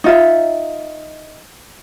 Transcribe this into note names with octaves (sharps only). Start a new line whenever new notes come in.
D#4 F4 E5